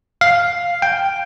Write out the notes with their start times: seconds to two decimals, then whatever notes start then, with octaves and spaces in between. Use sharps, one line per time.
0.21 F5
0.82 G5